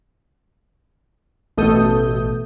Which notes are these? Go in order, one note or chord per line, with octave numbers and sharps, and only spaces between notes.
A1 B2 A3 A4 D#6 G6